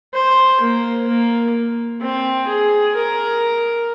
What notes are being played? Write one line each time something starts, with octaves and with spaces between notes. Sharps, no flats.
C5
A#3
A#3
C4
G#4
A#4